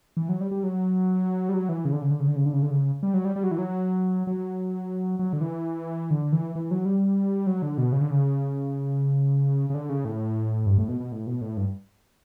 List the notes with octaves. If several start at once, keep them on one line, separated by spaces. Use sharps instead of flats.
E3
F#3
G3
G3
F#3
G3
F#3
E3
C#3
D3
C#3
D3
C#3
D3
C#3
D3
C#3
D3
C#3
G3
F#3
G3
G3
F#3
E3
F#3
F#3
F#3
D3
E3
D3
E3
E3
F#3
G3
F#3
D3
B2
C#3
D3
C#3
C#3
D3
C#3
A2
G2
A2
B2
B2
A2
B2
A2
G2